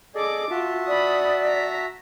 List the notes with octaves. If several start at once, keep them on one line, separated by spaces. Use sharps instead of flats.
G#4 A4 D5 D#5 D6
F4 F#4 E5 A5
D5 B5 D#6
A#5 B6